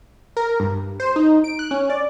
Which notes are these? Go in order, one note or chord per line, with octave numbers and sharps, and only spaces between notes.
A#4
G2
C5
D#4
D7
F#6
C#4
D5